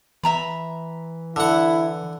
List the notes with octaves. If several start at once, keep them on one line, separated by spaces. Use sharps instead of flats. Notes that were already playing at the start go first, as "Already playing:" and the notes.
E3 E5 A#5 B5
D3 E4 F#5